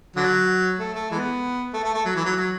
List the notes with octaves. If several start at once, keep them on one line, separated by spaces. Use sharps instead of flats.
D3 F#3
A3
A3
E3 G#3 B3
A3
A3
A3
F#3
E3
F#3
F#3